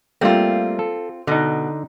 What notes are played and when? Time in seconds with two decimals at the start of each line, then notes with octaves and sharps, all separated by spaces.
0.21 G3 A3 A#3 C4 F4
0.79 A4
1.27 B2 D3 D#4